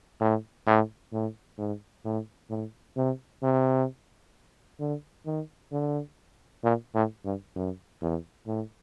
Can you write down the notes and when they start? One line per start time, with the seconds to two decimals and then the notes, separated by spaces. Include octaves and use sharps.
0.21 A2
0.67 A2
1.12 A2
1.58 G#2
2.04 A2
2.50 A2
2.97 C3
3.43 C3
4.80 D3
5.26 D#3
5.72 D3
6.64 A#2
6.95 A2
7.25 G2
7.56 F#2
8.02 E2
8.47 A2